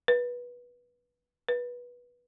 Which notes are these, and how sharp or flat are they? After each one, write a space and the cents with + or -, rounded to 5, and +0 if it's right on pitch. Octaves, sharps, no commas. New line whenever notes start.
B4 -20
B4 -20